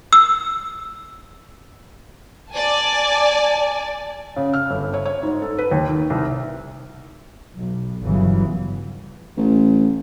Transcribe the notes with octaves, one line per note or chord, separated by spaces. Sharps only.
E6
D5 G#5 A5
C#3
F6
G1
C#5
C#5
G#2
A4
B4
D#2
D#3
C2
B1
G1 C#3 E3 F#3
A1